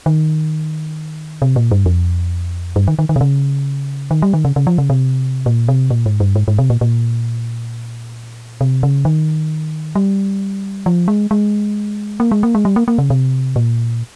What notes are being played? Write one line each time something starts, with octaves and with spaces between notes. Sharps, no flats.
D#3
C3
A#2
G2
F2
G2
D#3
D#3
D#3
C3
C#3
D#3
G3
D#3
C#3
C#3
F3
C#3
C3
A#2
C3
A#2
G#2
G2
G#2
G#2
C3
A#2
A#2
C3
C#3
D#3
G3
F3
G#3
G#3
A#3
G#3
A#3
G#3
G3
A#3
A#3
C#3
C3
A#2